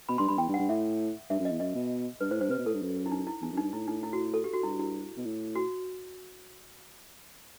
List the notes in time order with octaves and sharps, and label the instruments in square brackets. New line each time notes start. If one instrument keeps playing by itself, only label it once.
[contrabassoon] B2 [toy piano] B5
[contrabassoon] G2 [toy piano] C6
[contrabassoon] G2 [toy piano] B5
[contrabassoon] E2 [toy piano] G5
[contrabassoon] G2
[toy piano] F#5
[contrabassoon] G2
[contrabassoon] A2 [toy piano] E5
[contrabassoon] G2 [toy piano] E5
[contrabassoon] F#2
[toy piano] D#5
[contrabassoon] E2
[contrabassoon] F#2 [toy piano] D#5
[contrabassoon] B2
[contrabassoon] G2 [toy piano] B4
[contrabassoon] A2 [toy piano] C5
[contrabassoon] G2 [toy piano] C5
[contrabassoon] C3 [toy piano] B4
[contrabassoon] B2
[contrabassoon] A2 [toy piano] A4
[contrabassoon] G2
F#2
[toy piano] E4
D#4
E4
[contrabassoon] E2 [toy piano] D#4
[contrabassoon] F#2
[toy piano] D#4
[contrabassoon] G2
[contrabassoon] A2 [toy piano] E4
[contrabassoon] A2 [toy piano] D#4
[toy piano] E4
F#4
A4
G4
F#4
[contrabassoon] G2 [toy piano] E4
[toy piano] E4
[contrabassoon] B2
A2
[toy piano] F#4